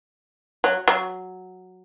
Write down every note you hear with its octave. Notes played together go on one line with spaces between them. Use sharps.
F#3
F#3